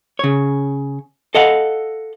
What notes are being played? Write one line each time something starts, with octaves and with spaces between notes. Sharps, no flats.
C#3 C#5
A4 D#5 F5 F#5